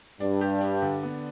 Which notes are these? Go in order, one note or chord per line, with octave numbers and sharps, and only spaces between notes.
G2 D4
G4
D4
D3
B3